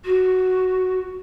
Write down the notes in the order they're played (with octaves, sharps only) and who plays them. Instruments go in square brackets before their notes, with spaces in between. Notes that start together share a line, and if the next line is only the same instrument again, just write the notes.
[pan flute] F#4